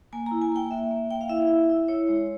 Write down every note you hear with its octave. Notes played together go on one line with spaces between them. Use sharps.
A#3 G#5
E4 A#5
G#5
A#3 G5
A#3 E5
A#3
A#3 G5
F5
E4 E5
E4
E4
E4 C#5
G#3